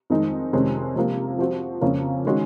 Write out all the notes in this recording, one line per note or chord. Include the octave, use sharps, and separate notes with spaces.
F2 D#3 G#3 D#4
F2 C3 D#3 G#3 C#4
C3 F3 A#3
F3 C4 F#4
F2 C#3 F3 A#3 C#4
D#3 G#3 C#4 F#4